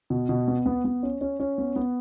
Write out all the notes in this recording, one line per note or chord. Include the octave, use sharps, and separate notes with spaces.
B2
B2
B3
B3
B3
C#4
C#4
C#4
B3
B3